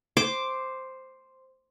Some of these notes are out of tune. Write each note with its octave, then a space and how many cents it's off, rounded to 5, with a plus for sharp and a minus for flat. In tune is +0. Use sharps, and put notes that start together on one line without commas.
C5 +0 D6 +0